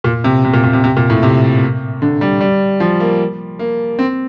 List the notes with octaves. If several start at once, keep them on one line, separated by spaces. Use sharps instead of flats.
A#2
C3
C3
A#2
A#2
C3
C3
A#2
A2
C3
D3
G3
G3
F3
A#3
A#3
C4